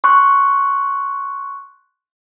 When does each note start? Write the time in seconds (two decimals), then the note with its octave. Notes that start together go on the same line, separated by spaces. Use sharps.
0.04 C6 C#6 F#6